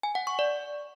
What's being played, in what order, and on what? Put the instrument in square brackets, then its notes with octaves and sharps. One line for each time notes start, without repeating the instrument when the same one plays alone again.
[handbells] G#5
F#5
C#6
D5